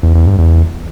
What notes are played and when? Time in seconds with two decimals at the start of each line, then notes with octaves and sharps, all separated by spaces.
0.03 E2
0.15 E2
0.27 G2
0.38 E2